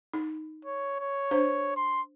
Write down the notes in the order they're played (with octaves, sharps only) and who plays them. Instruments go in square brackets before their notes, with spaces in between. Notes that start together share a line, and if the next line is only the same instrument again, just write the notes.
[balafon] D#4
[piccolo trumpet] C#5
C#5
[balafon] D4 C5
[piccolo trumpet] C6